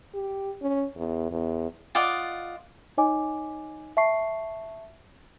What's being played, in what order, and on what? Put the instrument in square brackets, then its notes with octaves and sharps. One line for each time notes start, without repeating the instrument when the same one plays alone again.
[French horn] G4
C#4
E2
E2
[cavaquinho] F4 D5 D#5 F#5
[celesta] D#4 C#5 D#5 G#5 D6
E5 A5 C#6 C7